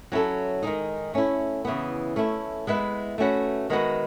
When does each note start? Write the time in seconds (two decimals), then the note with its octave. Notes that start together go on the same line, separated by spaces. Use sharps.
0.12 F#3 C#4 E4 A4
0.63 D#3 G#3 D#4
1.14 A3 C#4 E4
1.65 C#3 E3 B3
2.16 A3 C#4 E4
2.67 G#3 B3 E4 B4
3.18 A3 C#4 F#4 B4
3.70 D#3 G#3 B3 F#4 B4